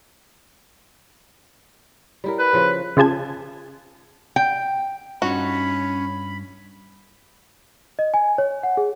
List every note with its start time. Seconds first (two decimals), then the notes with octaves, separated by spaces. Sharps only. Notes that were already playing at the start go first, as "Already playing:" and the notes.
2.24 G3 E4 A#4
2.39 B4
2.53 C#3 F3
2.97 C#3 F4 G#4 A5 G#6
4.36 G5
5.22 G2 C#4 D#4 F4 F#4 B5
7.99 D#5
8.14 G#5
8.38 C#5
8.63 F#5
8.77 G#4